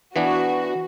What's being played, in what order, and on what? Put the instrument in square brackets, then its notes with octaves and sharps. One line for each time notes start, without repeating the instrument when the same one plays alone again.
[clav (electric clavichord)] E3 B3 D4 [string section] F#4